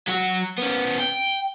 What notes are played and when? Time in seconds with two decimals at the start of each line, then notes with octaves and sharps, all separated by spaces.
0.08 F#3 F#4
0.58 B3 C#4
1.00 G5